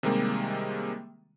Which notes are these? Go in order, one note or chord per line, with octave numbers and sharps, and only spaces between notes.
C3 D#3 G3 G#3 A#3